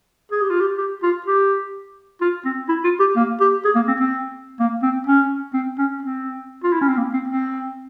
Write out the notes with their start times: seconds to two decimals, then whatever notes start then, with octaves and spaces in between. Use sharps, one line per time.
0.31 G#4
0.41 G4
0.50 F4
0.60 G4
0.78 G4
1.03 F4
1.27 G4
2.21 F4
2.45 C4
2.69 E4
2.84 F4
3.00 G4
3.16 A#3
3.40 G4
3.65 G#4
3.75 A#3
3.88 C4
4.00 C4
4.60 A#3
4.82 C4
5.07 C#4
5.54 C4
5.78 C#4
6.02 C4
6.64 F4
6.73 E4
6.81 C#4
6.88 C4
6.97 A#3
7.13 C4
7.28 C4